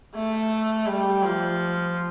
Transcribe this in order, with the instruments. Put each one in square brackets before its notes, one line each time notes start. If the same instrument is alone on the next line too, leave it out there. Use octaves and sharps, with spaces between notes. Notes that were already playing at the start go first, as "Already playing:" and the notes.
[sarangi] A3
G3
F3